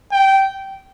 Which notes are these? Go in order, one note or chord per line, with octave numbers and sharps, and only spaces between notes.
G5